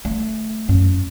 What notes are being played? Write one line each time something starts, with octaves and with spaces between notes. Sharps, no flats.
A3
F#2